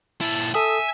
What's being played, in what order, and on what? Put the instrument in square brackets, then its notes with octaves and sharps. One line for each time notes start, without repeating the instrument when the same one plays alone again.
[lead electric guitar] A#2 E4 [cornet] A5
[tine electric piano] A4 D#6 [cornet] E5 [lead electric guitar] G#5